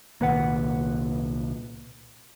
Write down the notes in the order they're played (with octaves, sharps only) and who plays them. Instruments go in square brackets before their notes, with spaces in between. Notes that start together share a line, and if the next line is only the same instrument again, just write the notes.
[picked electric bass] C2 D#3 A#3 [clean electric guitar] A#2 B4 F#5